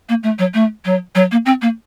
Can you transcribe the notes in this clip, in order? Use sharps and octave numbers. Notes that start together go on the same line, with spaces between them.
A#3
A3
F#3
A3
F#3
F#3
A#3
C4
A#3